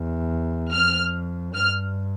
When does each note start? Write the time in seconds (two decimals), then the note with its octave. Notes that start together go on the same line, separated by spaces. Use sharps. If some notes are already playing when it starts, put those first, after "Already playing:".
Already playing: E2
0.71 F2 F6
1.54 G2 F6